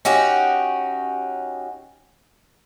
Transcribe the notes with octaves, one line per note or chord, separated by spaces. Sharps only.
C#4 D#4 F#4 G4